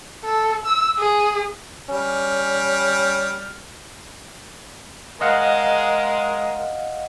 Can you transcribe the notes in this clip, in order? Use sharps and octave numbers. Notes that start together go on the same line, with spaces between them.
A4
E6
G#4
G3 C#4 F6
G#3 A#4 D#5 F5 F#5